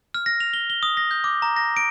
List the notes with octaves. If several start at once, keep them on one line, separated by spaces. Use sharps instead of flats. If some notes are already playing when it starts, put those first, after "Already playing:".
F6
A#6
F7
G7
G7
D#6
A#6
G6
D6
A#5
A#6
D7